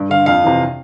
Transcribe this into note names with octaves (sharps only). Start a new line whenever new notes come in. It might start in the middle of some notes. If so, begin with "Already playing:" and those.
Already playing: G2
D3 F5
F2 F5
C3 E3